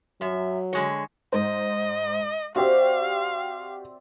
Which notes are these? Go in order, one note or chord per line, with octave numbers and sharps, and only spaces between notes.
F#2 F#3 E5
D3 G#3 C#5
G#2 C5 D#5
C4 F#4 G4 D5 E5 F5